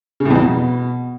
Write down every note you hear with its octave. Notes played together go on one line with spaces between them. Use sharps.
C#3
A2
E2
F2
B2